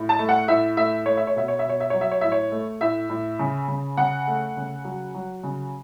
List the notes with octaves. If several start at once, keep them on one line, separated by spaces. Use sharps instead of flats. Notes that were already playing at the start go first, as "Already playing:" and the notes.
Already playing: A2
A5
A3
F#5
A2 E5
A3 E5
A3 C#5
E5
C#5
B2 E5
C#5
E5
B2 C#5
E5
F#3 C#5
E5
C#5
A2 E5
C#5
A3
A2 E5
A2
C#3
C#3
C#3 F#5
A3
C#3
F#3
F#3
C#3